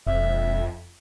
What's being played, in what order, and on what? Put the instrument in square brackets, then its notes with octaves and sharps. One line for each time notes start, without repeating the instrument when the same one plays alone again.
[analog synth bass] E1 [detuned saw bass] F2 [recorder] E5